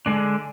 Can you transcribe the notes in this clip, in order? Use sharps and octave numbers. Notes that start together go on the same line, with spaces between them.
D3 G#3 D4